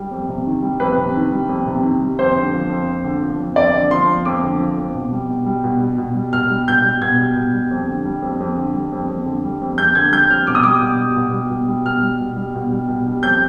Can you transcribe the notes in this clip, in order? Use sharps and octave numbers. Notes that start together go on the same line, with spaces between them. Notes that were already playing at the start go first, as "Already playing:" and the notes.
Already playing: G3
F2
C3
D#3
G3
F2 B4
C3
D#3
G3
F2
C3
D#3
G3
F2 C5
D3
F3
F2
F2
D3
F3
F2
F2 D5
D3
F3 C6
F2
F2 D6
D3
F3
F2
B2
G3
B2
G3
B2
G3
B2
G3
B2 F6
G3
B2 G6
G3
B2 G#6
G3
B2
G3
F2
D3
G3
F2
F2
D3
G3
F2
F2
D3
G3
F2
F2 G6
D3 G#6
G3 G6
F2 F6
B2 D6
D#6
G3 D6
B2
G3
B2
G3
B2
G3
B2 F6
G3
B2
G3
B2
G3
B2
G3
F2 G6